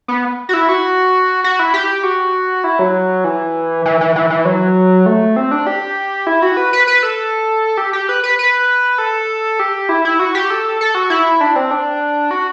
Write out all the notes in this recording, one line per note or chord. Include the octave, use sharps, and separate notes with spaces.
B3
F#4
E4
F#4
F#4
E4
G4
F#4
E4
F#3
E3
E3
E3
E3
E3
F#3
A3
C4
D4
G4
E4
F#4
B4
B4
B4
A4
G4
G4
B4
B4
B4
A4
G4
E4
E4
F#4
G4
A4
A4
F#4
E4
D4
C4
D4
F#4